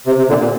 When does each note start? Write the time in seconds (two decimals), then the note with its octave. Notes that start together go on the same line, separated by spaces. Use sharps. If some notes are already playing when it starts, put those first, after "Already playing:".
0.07 C3
0.18 C3
0.29 A#2 D3
0.39 A#2